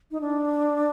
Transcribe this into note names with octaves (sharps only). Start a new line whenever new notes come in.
D#4
D4